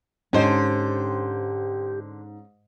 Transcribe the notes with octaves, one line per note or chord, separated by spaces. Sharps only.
G#2 D3 C#4 G4 C5 D#5